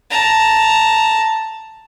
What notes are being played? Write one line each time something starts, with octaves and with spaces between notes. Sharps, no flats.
A5 A#5